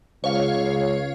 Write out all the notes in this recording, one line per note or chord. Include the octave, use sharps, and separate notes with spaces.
C#2 C#5 F5